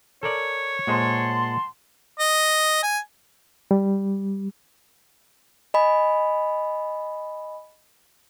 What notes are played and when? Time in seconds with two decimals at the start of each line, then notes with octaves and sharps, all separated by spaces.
0.23 A4 A#4 C#5 D5
0.87 A#2 G#3 C5 F#5 A5 C6
2.19 D#5
2.83 G#5
3.71 G3
5.74 D#5 G#5 B5